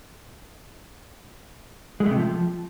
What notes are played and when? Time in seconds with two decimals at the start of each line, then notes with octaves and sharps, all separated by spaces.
2.00 G#3
2.06 A3
2.11 C3
2.16 F3